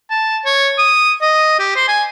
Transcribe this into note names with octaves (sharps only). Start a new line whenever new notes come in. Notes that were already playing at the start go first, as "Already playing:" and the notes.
A5
C#5
D#6
D#5
G4
C5
G#5